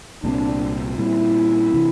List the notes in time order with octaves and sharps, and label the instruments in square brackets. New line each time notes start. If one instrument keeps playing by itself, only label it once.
[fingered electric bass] C2 A#2 G3 C4 [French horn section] D4
[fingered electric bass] A#2 G3 C4 [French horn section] E4
[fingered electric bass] C3 E3